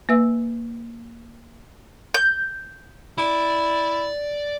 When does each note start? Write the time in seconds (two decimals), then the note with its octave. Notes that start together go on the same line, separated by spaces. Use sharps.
0.09 A#3 B4 E5 E6
2.14 G6
3.18 E4 D5